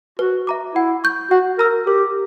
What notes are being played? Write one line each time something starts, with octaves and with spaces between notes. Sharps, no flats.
F#4 B4
E5 A#5 D6
E4 F#5
C#6 G6
F#4 F#5
A#4 A#5 E6
G4 A#4